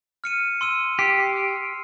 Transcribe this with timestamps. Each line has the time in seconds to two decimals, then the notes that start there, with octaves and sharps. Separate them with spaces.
0.24 F6 C#7 D#7
0.61 C6 E6 D#7
0.99 G4 C7